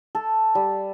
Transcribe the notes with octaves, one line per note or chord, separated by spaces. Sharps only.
A4
G3